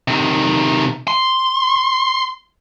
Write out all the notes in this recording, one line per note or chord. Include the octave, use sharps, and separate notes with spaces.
C3 D#3
C6